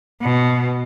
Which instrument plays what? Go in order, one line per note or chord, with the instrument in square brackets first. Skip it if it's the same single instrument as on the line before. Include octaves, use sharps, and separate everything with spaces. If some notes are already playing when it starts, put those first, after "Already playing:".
[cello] B2